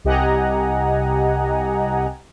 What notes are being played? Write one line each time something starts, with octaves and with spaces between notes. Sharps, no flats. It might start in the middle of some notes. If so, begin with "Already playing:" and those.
C2 G4 D#5 F#5 G#5 A#5